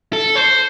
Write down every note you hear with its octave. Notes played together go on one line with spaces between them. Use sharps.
A4
C5